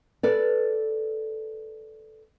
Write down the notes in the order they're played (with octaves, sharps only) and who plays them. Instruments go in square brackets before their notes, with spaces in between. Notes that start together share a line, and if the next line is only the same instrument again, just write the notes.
[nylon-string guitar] A4 B4 D5